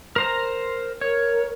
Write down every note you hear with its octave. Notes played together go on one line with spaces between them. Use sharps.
A#4 C5 A#5
A#4 C#5